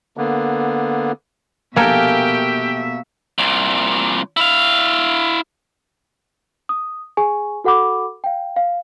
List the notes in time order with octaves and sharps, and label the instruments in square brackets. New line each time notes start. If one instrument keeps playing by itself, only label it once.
[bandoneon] D3 A#3 B3
[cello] B2 E5 [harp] A#3 [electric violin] G4 G5 [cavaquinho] A4 A#4 G#5
[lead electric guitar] C2 A#2
E4 F5
[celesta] D#6
G#4 G#5 C#6
F#4 A4 F#5 B5 D6
F5 G5
F5